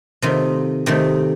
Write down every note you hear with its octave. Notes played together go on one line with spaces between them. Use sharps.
C3 D#3 A3 F4
C3 D#3 A3 G4